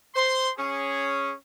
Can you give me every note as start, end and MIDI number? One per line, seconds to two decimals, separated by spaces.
0.15 0.49 72
0.15 0.49 84
0.57 1.31 61
0.57 1.31 68